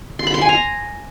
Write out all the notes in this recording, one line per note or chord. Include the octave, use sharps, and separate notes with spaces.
C6
B5
C6
G#5
A#5